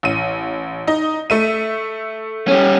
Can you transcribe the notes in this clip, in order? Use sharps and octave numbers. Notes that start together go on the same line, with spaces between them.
A1 D#7
D#4 D#5
A3 E5 D#7
G3 C#4